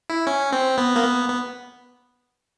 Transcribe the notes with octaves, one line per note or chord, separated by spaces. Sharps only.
E4
C#4
C4
B3
A#3
B3
B3